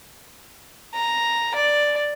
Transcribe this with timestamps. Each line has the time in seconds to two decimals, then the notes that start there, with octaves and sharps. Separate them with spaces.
0.94 A#5
1.55 D5